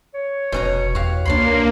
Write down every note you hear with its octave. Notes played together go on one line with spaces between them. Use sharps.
C#5
F1 B2 C#4 A#5
E2 F#4 G4 F5
C#2 A#3 D4 C#5 B5 C6